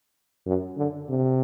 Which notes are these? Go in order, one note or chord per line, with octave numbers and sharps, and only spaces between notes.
F#2
D3
C3